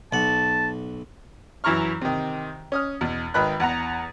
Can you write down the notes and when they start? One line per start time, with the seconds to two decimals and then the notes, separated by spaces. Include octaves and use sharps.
0.13 B1 F#5 A5
1.64 F#2 E3 E4 A#5 C#6 F6
2.01 C3 D#3
2.72 C#4 D#6 F6
3.01 E2 B2
3.34 G#1 D#3 B4 B5 F#6
3.60 E2 F#5 A#5